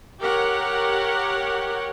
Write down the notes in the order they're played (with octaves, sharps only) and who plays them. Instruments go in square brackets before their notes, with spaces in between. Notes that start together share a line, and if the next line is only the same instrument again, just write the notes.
[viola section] G4 A#4 C#5 F#5